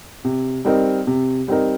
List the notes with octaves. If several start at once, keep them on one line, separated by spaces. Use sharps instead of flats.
C3
G3 C4 D#4 A#4
C3
G3 C4 D#4 A#4